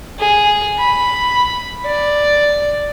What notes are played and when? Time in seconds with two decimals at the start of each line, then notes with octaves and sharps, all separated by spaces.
0.19 G#4
0.78 B5
1.86 D5